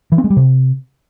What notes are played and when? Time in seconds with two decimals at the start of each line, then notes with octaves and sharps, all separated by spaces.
0.12 E3
0.18 C4
0.24 G#3
0.30 G3
0.37 C3